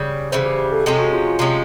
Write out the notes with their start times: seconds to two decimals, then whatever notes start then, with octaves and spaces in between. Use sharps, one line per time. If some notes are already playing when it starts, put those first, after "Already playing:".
Already playing: C#3 G3
0.32 C#3 E3 G3 C5
0.46 G4
0.58 G4
0.72 A4
0.85 C3 F3 G#3 C#4 G#4
0.99 F#4
1.13 F4
1.27 F4
1.39 C3 F3 G#3 C#4